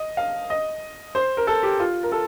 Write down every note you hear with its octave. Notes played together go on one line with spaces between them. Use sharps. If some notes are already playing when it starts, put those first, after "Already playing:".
Already playing: D#5
F5
D#5
C5
A#4
A4
G4
F4
A#4
A4